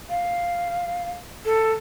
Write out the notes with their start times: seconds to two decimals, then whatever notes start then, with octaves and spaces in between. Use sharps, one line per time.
0.09 F5
1.45 A4